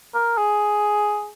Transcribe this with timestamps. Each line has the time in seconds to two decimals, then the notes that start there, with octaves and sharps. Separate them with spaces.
0.15 A#4
0.38 G#4